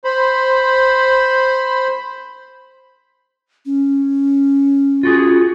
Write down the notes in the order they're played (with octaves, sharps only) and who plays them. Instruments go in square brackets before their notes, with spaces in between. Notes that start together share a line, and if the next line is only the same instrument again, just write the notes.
[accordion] C5 B5
[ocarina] C#4
[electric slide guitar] F4 F#4 G#4